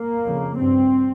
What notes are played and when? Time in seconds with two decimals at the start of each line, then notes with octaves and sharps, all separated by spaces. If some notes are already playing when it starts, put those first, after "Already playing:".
Already playing: A#3
0.26 F2 C#3
0.58 G2 C4